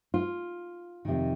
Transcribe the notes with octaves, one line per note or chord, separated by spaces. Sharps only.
F4
F2 C3 D#3